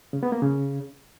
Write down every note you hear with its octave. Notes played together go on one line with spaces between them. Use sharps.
C#3
B3
A#3
C#3